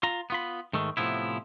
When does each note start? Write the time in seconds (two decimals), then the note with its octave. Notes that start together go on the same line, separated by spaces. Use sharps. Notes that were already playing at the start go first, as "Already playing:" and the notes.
0.03 F4 A#5
0.30 B3 F4 B5
0.73 G#2 D#3 A3
0.97 A2 C3 F3 B3 E4